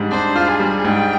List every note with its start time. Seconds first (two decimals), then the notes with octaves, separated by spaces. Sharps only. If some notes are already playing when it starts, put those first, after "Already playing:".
Already playing: G#2 G3 D4
0.10 D4 C5
0.36 F4
0.48 G#4
0.60 G3
0.84 G#2 G5